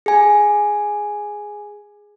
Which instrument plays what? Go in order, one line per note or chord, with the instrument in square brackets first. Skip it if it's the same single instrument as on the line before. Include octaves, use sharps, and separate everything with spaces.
[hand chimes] G#4 G#5